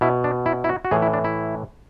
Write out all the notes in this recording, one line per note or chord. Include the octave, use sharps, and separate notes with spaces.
B2 E4
D4
E4
E4
F#4
F#4
A2 E3 G#4
E4
D4
E4